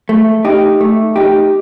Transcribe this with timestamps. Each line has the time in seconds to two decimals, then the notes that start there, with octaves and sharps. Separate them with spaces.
0.09 A3
0.45 D#4 G4
0.80 A3
1.16 D#4 G4